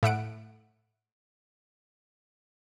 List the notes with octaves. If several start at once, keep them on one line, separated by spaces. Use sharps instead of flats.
A2 E5 F#5 D7